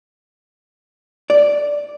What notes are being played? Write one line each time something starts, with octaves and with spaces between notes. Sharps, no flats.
D5